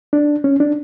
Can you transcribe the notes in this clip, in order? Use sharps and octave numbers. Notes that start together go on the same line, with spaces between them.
D4
C#4
D4